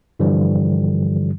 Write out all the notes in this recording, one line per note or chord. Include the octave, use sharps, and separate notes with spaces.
G2 D3 E3 F3 G3